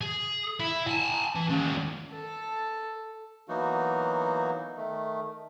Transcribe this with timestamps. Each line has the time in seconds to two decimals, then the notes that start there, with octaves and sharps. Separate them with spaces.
0.01 G#4
0.60 E4
0.87 G#5 A5
1.35 E3
1.49 D#2 C#4
2.13 A4
3.49 E3 F#3 A#3 B3 D#4 F#4
4.77 D#3 A3